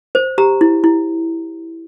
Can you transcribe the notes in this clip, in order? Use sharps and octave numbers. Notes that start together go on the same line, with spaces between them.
C5
G4 A#5
E4
E4